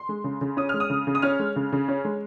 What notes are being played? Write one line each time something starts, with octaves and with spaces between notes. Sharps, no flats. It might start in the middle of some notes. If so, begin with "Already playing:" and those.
Already playing: C6
G#3
C#3
C#3
C#4 D#6
G#3 F6
D#6
C#3
C#3
D#6
C#4 F6
G#3
C#3
C#3
C#4
G#3